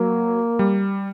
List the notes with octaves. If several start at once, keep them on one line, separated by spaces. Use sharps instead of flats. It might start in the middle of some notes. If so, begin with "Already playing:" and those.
Already playing: F#3 A#3
G3